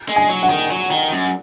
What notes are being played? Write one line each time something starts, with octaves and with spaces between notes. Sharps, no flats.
G#3
G#5
F#3
F#5
D#3
F#3
D#3
F#2